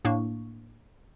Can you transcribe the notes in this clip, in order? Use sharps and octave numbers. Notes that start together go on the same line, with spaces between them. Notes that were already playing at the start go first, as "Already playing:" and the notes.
A2 A#3 D4 C#6